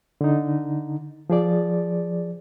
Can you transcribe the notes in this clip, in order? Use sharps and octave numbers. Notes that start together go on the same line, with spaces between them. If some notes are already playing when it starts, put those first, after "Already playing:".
D3 D#4
F3 G#4 D5